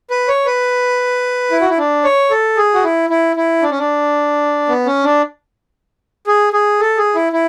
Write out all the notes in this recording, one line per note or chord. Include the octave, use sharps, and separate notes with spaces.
B4
C#5
B4
E4
F#4
E4
D4
C#5
A4
G#4
F#4
E4
E4
E4
D4
C#4
D4
B3
C#4
D4
G#4
G#4
A4
G#4
E4
E4